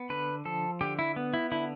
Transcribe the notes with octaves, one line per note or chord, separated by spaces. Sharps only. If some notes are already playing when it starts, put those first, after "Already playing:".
Already playing: B3
D3 B4
F3 A4
D3 G4
E4
B3
E4
D3 E4